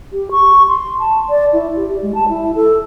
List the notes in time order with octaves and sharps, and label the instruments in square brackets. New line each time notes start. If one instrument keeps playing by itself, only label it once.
[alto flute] G4
C#6
C6
A5
D5
E4
G4
G4
G#3
A5
E4
A4